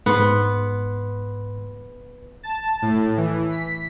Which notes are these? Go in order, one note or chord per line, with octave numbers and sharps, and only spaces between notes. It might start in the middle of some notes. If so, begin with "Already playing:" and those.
G#2 B3 C6
A5
A2
E3
B6